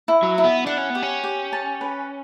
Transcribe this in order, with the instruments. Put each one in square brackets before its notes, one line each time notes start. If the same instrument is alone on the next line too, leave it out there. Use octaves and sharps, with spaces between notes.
[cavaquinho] E4
[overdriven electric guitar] F#3
[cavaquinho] E4
[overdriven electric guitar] B3
[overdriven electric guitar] D4 [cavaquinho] F#5
[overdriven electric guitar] C#4
[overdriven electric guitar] B3 [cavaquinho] G4
[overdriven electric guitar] C#4
[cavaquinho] G4
A5
B4